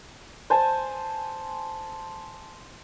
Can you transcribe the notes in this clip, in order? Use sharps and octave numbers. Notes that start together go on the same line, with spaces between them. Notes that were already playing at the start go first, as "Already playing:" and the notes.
C5 G#5 A5 C6